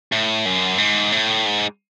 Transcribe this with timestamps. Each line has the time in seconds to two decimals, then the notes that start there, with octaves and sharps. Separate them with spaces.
0.12 A2
0.46 F#2
0.78 G#2
1.12 A2
1.46 G#2